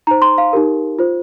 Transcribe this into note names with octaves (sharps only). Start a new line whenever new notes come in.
D#4 C5 A#5
C6
F5
D#4 G4 A#4
F4 C5